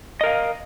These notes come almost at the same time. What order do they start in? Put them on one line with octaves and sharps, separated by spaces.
D#5 A#4 F5